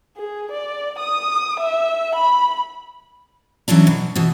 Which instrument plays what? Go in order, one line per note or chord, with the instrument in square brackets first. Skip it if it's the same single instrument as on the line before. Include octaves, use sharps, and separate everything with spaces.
[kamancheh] G#4
D5
D#6
E5
B5
[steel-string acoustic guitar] E3 F#3 C#4 D4
B2
B2 E3